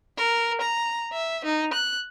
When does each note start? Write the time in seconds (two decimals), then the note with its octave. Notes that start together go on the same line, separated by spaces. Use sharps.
0.17 A#4
0.61 A#5
1.13 E5
1.45 D#4
1.73 F#6